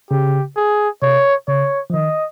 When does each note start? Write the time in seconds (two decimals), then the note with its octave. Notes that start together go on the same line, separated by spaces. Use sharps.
0.10 C#3 G4
0.57 G#4
1.02 C3 C#5
1.48 C#3 C#5
1.90 F3
1.94 D#3 D#5